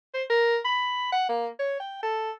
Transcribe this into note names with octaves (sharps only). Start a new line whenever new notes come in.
C5
A#4
B5
F#5
A#3
C#5
G5
A4